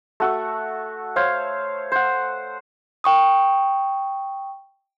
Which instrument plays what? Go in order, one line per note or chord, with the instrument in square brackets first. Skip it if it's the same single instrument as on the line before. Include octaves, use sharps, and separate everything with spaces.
[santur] A3 F#4 A4
C5 C#5 F5
C5 F#5
[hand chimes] G5 C#6 D#6